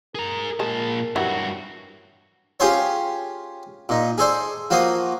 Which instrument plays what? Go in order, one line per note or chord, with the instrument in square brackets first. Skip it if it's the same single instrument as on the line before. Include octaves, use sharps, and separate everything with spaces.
[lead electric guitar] G#4 A#5 [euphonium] A#4
[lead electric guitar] A#2 A5 [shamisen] G#3
[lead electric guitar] G2 F#4 [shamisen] E3 F#3 G3
[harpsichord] C#4 F4 G4 G#4 C5 C#5
A#2 D#4
G#4 A4 C5 D5
F3 A#3 F#4 C5 D#6